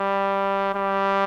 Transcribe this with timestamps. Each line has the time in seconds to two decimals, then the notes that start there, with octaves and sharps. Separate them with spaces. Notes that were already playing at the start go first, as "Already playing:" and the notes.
Already playing: G3
0.75 G3